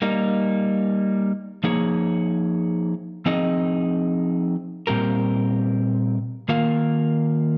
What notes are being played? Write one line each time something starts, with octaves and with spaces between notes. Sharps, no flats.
G3 A#3 D#4
F3 A#3 D#4 G#4 C#5
F3 C4 D#4 G#4 D#5
A#2 G3 C4 G4 A#4
D#3 A#3 F4 A#4 F5